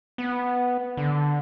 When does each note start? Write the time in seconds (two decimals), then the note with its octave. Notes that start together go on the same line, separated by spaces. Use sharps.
0.18 B3
0.97 D3